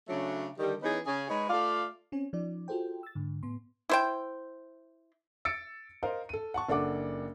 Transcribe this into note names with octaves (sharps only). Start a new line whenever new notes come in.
C#3 F#3 A3 C#4 D4
D3 D#3 G3
E3 B3 C#4 D#4 G#4
C#3 G#4
G#3 D#4 B4 C#5
A3 F4 D5 F5
C4 C#4 C#5 G#5
F3 C#4 D#4 D5
F4 F#4 G#4 A4 C5 G5
E6 A6
G#2 D3
A2 B3 C6
E4 C5 G5
E6 A6 C#7 D7
A#4 C5 D#5 F5
A4 D#7
F#5 A5 C#6
F#1 D4 A4 F#5 D6